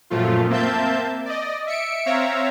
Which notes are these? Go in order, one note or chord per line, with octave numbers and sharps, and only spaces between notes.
F#2 A#2 F3 A3 F4
A#3 C4 E5 A5 G6
D5 D#5
E5 C#7 D7
C4 C#5 E5 F5 A#5